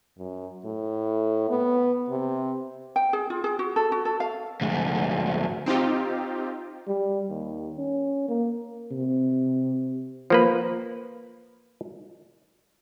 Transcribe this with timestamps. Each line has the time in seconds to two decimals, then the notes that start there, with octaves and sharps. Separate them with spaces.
0.18 F#2
0.65 A2
1.49 B3
2.09 C3
2.96 G5
3.13 G#4
3.30 F4
3.44 G#4
3.59 F#4
3.76 A4
3.92 F#4
4.05 A4
4.20 F5
4.61 D2 G#2
5.66 C4 D#4 F4 G4
6.87 G3
7.30 D#2
7.78 C#4
8.28 A#3
8.91 C3
10.30 F3 A#3 B4